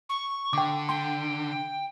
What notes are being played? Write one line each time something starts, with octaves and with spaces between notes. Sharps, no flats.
C#6
D3 G5 D6
G5 C6